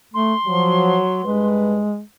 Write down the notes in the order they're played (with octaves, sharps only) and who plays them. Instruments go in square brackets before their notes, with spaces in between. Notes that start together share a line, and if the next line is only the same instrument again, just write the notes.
[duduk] A3 [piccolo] C6
[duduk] F3 [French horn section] F#3
[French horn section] G2 B4 [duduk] G#3